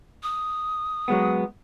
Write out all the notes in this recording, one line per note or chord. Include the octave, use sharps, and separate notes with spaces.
D#6
F#3 G#3 B3